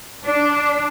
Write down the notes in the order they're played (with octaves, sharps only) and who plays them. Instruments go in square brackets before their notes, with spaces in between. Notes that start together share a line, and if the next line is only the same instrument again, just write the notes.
[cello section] D4